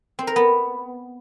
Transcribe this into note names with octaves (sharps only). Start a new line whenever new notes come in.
C4
A#4
B3